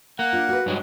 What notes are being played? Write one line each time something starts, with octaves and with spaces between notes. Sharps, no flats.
A#3 F#5
D4 F4
F#4 B4
G2 F#3 G#3